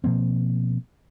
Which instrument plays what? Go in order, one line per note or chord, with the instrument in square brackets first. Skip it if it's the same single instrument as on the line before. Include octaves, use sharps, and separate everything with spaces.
[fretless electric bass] B2 F3 A#3 C4